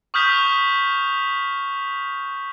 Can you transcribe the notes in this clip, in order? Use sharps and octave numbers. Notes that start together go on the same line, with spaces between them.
C#6 D#6 F6 G6 B6 F7